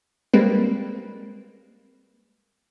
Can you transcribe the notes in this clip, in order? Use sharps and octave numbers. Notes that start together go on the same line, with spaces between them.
G3 G#3 A#3 C4 B4